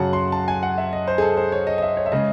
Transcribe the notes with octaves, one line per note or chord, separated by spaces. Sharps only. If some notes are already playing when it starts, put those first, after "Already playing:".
Already playing: F#2 C#3 F#3 F#5 A5
C6
A5
G#5
F#5
E5
D#5
C5
G#4
A4
C5
C#5
D#5
D#5
E5
C#5
E5
C#3 G#3 D#5